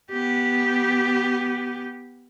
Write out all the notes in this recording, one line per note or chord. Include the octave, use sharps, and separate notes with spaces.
B3 G4